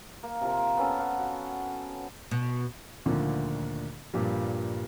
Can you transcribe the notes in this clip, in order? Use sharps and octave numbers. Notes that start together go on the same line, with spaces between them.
A#3
C3 F3 A#4
B3 C#4 A4
F5 F#5
F#4
B2
D2 A#2 D3 D#3 F3
G2 A#2 F3 G3